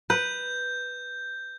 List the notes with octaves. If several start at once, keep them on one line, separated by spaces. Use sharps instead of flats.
B4 G6